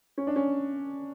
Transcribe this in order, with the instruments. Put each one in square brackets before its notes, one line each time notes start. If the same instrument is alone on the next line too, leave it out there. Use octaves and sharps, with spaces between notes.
[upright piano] C#4
D4
C#4